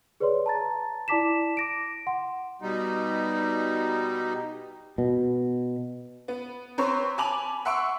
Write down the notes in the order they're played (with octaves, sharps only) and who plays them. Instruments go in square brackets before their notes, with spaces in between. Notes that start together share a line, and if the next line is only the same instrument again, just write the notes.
[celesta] G#4 B4 C#5 D5 C6
A5 A#5 A6
E4 D5 A5 D6 B6 E7
D6 A#6 D7
F#5 C6
[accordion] B2 G3 D#4
[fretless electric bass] B2
[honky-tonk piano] B3
C4 B4 C#5 A#5 C6
G#5 A5 B5 D6 F7 F#7
E5 F#5 C6 C#6 E6 D7